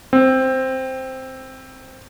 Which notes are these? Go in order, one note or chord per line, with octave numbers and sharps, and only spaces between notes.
C4